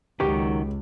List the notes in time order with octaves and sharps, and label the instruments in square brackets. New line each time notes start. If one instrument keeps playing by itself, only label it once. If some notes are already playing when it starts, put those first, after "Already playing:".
[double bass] C#2 [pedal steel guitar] D#3 F#3 C#6 [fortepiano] G4